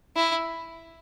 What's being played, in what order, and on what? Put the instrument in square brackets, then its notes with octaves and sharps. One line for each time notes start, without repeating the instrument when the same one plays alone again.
[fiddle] E4